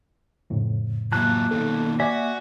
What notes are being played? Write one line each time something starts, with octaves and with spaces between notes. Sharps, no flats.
F2 A2 C#3
E3 F#3 A#3 A5 F#6
B2 D#3 A4
F#4 D5 E5 G#5